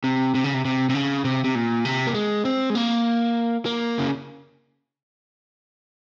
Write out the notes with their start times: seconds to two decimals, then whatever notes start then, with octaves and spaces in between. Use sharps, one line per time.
0.04 C3
0.35 C3
0.44 C#3
0.54 C3
0.65 C3
0.90 C3
0.94 C#3
1.25 C3
1.44 C3
1.55 A#2
1.85 C3
2.07 A#3
2.14 G#3
2.45 C4
2.70 G#3
2.75 A#3
3.66 A#3
3.99 C#3